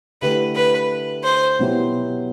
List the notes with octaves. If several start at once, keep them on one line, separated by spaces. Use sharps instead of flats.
D3 A3 E4 G4 B4
B4
C5
B2 F#3 B3 E4 G4